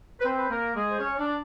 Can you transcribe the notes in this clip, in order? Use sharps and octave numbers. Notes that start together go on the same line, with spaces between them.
B4
C4 C5
B4
A#3 A#4
G#3 G#4
C5
C#4 C#5
D4 D5